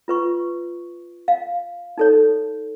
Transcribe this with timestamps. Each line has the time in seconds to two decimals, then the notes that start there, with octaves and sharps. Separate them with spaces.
0.08 F4 B4 C#6
1.28 F5
1.98 D#4 A4 C#5